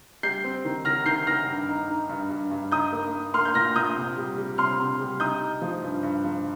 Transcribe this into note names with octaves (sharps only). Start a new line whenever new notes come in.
G3 G6 C7
C4
D#3
D#3 F6 A#6
D#3 G6 C7
D#3 F6 A#6
G2
D#4
D#4
G2
G2
G2
D#4 D#6 G6
A#3
D#4
A#3 C6 F6
G6
A#2 F6 A#6
A#2 D#6 G6
C3
G3
G3
C3 C6 F6
C3
G3
D#4 D#6 G6
D#4
F3
G2
G2
F3